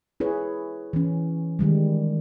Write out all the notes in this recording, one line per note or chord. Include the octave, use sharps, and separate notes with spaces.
E4 G#4 B4 C#5
E3 C#4
D#3 G3 G#3